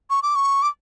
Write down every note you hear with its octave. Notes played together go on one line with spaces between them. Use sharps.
C#6
D6
C#6
D6